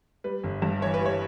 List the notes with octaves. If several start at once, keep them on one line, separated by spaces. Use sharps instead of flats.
G3 B4
G1
G2
E3 C#5
B4
G3 C#5